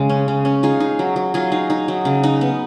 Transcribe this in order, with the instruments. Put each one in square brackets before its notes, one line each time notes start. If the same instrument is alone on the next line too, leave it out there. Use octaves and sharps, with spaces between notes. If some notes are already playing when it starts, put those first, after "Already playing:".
Already playing: [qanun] C#3 G#3
C#4
C#3
C#4
D#4 F4 G#4
D#4
F#3
F#3
F#3 F4 G#4
D#4
D#4
F#3
C#3
D#4
B3